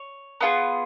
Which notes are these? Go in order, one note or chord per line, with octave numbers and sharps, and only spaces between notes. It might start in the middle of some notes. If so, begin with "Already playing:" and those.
Already playing: C#5
B3 F4 G#4